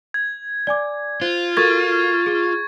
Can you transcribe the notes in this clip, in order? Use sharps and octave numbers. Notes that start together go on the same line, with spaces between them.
G#6
D5 G#5 D6
F4 C5
F#4 A4 A#4 C#6 G#6 A6
G#4 C#6